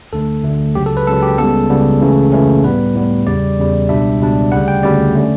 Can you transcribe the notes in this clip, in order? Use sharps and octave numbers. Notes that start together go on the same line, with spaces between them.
D2 D3 A3 A4
D2 D3 A3
C#2 C#3 F#3 G4
A4
B4
C#2 C#3 F#3 A4
G4
C#2 C#3 G3 B3 A4
C#2 C#3 G3 B3
C#2 C#3 E3 A3 C#4
C#2 C#3 E3 A3 C#4
A2 G3 B3 B4
A2 G3 B3
E2 C#3 G3 D5
E2 C#3 G3
C#2 B2 G3 D4 E5
C#2 B2 G3 D4
D2 C#3 G3 F#5
G5
D2 C#3 G3 D5
D3 A3 C#4